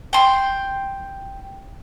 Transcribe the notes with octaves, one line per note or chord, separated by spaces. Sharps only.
G5 C6